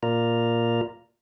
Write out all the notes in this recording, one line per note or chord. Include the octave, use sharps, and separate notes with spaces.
A#2 F4 A#4 D5 A#5